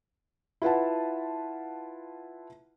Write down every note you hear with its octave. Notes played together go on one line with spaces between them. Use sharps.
E4 F4 B4 F#5 A5